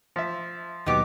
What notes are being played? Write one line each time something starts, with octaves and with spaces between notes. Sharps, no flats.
F3 E5
D#2 B2 F#3 B3 D#4 G4 D6